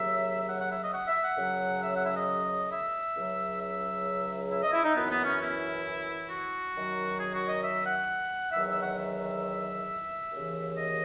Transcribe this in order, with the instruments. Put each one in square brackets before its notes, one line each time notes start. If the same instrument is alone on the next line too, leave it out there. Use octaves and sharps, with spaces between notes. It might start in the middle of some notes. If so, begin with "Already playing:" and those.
Already playing: [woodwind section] D#2 C#3 F#3 E5
F#5
F#5
E5
D#5
F#5
E5
F#5
F#2 C#3 F#3
E5
F#5
E5
D#5
E5
C#2 C#3 F#3
E5
E5
D#5
E4
D#4
F#2 E3 B3
B3
C#4
E4
F#4
F#2 D#3 F#3
G#4
F#4
D#5
E5
F#5
E2 D#3 F#3 E5
E5
F#5
E5
D#2 C#3 E3
D#5